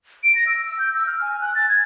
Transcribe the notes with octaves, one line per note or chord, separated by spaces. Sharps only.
D7
A#6
E6
E6
G6
E6
F6
G#5
F#6
A6
G#6